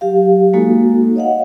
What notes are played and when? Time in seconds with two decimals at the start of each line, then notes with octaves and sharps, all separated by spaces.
0.01 F#3 G4 F5
0.53 G#3 A#3 D#4 F#4 A4
1.16 C#5 D#5 F5 F#5